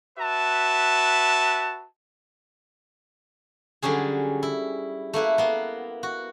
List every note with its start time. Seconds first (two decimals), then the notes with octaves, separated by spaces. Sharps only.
0.17 F#4 B4 E5 A5
3.82 D3 F#3 G3 C#4 G#4
4.43 E4
5.13 A3 A#3 E4 B4
5.38 A#3 B3
6.03 F#4